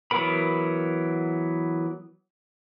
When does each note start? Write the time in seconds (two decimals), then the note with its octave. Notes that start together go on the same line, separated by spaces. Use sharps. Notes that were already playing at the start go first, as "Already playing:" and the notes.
0.11 E3 F#3 B3 A#4 B5